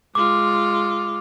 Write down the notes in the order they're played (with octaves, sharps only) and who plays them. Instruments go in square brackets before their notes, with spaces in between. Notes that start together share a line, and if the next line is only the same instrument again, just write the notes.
[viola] G#3 F4 [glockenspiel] D6